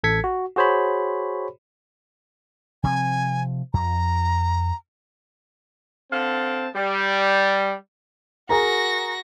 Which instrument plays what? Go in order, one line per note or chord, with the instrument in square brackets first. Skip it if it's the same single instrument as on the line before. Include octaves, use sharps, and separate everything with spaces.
[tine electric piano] A1 A4 G#6 B6 C#7
F#4
F#4 G#4 C5 C#5 B5
[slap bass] C3 F3 C4 [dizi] G#5
[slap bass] F2 [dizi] A#5
[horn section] D3 C4 F5 A5
G3
[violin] F#4 A#6 [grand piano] G#4 A#4 A#5